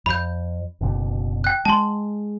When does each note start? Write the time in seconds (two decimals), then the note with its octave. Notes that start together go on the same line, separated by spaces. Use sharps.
0.06 F2 B5 G6
0.81 F#1 B2 D3
1.44 G5 F#6
1.65 G#3 A5 C6